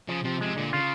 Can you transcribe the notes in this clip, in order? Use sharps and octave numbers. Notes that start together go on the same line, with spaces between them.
C#3 F3
C3 F3
C3 G#3
A#2 D3
C#3 F4